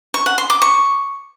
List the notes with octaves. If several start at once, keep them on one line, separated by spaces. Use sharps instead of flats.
C#6
F#5
C6
D6
C#6